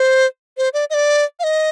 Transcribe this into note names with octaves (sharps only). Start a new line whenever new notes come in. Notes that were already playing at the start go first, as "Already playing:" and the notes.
Already playing: C5
C5
D5
D#5
D5
F5
D#5